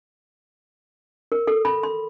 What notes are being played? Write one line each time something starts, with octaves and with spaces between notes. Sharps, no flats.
A#4
A4
B5
C6